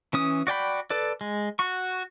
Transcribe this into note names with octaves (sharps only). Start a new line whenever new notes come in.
E3 C#4 D#6
F#4 D5 G5 B5
A4 B4 D5
G#3
F#4 C#6